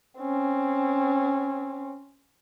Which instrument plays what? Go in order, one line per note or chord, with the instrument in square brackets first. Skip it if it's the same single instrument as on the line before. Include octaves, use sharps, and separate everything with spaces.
[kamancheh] C4 C#4